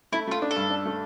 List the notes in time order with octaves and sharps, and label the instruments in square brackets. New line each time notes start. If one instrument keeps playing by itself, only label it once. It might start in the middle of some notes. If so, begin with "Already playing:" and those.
[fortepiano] A3 [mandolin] E4
[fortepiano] A3 [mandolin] F4
[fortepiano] D4
[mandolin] A4
[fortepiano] G2
D4
A3